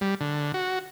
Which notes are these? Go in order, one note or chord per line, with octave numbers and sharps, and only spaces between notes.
G3
D3
F#4